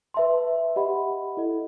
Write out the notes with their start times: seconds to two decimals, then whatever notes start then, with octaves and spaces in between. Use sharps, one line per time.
0.14 B4 E5 A5 C6
0.76 G4 D#5 F#5 B5
1.37 E4 A4 D#5